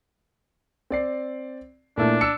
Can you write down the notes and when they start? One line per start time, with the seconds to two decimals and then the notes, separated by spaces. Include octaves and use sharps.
0.90 C4 D5 C7
1.97 A#2 A3 D4 E4
2.21 E6 C#7